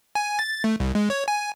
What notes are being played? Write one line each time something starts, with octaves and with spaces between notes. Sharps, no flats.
G#5
A6
A3
C2
G#3
C#5
G#5